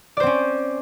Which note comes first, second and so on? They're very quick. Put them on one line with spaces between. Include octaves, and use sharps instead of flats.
D5 C5 C4 C#4